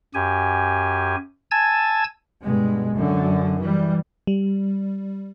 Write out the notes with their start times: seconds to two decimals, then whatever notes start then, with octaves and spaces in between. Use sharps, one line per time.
0.14 F#2 G4 G#5
1.51 G#5 A5 E6 G#6 A6
2.42 G2 B2 G#3
2.93 F#2 D3
3.58 E3 G3
4.27 G3